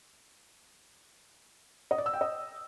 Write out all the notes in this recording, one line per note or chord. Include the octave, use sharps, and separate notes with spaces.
D#5
D5
E6
G5
D#5